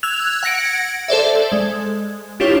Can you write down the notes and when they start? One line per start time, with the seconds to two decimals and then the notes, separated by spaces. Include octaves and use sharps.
0.03 E6 F#6 G#6 F7
0.43 F#5 G#6 A#6 C#7 D7
1.08 A4 C5 D5 E5
1.52 G#3
2.40 D4 E4 F4 G4 C#5